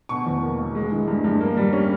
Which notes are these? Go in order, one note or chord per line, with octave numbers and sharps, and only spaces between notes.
B2 C#6
E2
A#3
E1
G#3
E3
G2
G2
A#3
G3
C#4